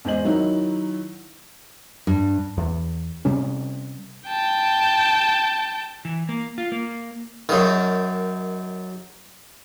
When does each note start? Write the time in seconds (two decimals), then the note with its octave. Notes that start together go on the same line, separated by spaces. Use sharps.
0.05 E2 G#3 G#4 C5 D#5 F#7
0.25 D#3 F#3 D#4 E4
2.07 G2
2.58 E2
3.25 C3 G3 C#4
4.27 G5 A5
6.05 E3
6.29 A#3
6.58 F4
6.72 A#3
7.49 F#2 D#3